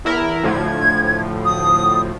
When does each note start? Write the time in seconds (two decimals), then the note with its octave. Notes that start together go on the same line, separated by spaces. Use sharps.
0.05 E2 E4 A#4
0.43 D2 A2 F3 G#6
1.45 D#6